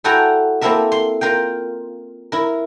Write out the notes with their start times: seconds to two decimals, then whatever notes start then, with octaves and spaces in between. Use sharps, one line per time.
0.04 E4 F#4 A4 G5 G#5 A#5
0.61 A#3 C4 E4 A4 A#4 E5
0.92 C6
1.21 F4 A#4 F5 G5
2.32 E4 A#4